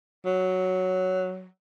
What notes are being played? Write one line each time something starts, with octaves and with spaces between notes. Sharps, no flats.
F#3